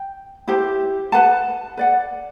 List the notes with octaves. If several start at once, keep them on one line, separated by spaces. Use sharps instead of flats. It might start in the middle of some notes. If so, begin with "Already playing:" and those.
Already playing: G5
E4 G4 C5
B4 F#5 A5
B4 D5 F#5